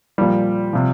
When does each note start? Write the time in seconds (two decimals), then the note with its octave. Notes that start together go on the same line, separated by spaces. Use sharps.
0.18 A#2 F3 G3
0.73 C3 F3